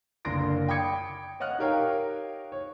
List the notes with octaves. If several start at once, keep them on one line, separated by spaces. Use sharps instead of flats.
F#1 D3 A#4 C6 A#6 D7
G5 B5 D6 D#6 G#6 C#7
C#5 D#5 F#5 F6 F#6
D#4 G4 A#4 C#5 F5 G5
C#5